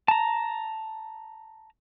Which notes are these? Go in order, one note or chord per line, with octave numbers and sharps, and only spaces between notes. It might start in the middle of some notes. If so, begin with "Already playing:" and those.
A5 A#5